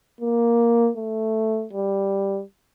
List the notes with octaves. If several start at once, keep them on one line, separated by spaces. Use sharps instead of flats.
A#3
A3
G3